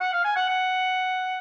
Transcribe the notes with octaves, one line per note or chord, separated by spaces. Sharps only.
F#5
F5
G#5
F#5
F#5